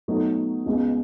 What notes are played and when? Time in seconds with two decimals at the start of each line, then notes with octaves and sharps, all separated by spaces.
0.08 B2 F#3 A3 D#4 A4
0.66 C#2 B2 G#3